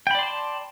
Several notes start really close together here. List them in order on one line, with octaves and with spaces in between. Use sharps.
G5 B5 D5 C6 A5